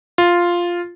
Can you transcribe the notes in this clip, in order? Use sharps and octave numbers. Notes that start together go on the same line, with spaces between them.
F4